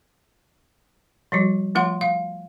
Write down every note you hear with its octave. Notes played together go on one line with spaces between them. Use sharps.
F3 G3 F#4
F3 A3 F4 F#5 C6
F5